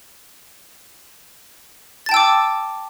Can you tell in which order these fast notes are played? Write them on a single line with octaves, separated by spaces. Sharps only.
A6 A5 G5 E6 D6